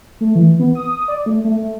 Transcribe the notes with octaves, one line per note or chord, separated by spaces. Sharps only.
A3
E3
B3
D#6
D#6
D5
A3
A3
A3